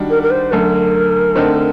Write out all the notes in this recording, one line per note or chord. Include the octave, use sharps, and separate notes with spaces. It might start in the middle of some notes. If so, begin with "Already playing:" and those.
Already playing: D#3 G3 D4 F#4
A#4
A#4
C5
F#2 D3 A3 A#4
D3 A3 C4 D#4